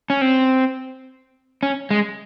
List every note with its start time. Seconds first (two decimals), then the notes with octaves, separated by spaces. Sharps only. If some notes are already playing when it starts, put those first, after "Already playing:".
0.10 C#4
0.21 C4
1.63 C#4
1.91 G#3